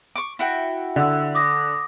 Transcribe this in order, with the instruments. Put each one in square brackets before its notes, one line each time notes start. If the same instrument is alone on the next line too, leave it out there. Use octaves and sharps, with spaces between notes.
[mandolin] C#6 D6
E4 F#4 G5
[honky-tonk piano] D3 [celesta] F#5 E6
[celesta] D6 D#6 A#6